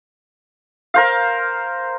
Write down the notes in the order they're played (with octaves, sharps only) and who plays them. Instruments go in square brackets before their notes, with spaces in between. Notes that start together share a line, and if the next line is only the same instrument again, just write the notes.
[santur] A#4 C5 F5